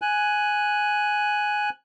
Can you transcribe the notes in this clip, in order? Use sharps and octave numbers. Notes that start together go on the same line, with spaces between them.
G#5 F#6